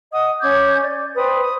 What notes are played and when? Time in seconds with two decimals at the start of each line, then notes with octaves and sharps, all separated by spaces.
0.12 D#5 F#5 D#6
0.40 C#4 D6 G6 G#6
0.81 D5
1.15 B4 C5 G5 D#6
1.42 D#6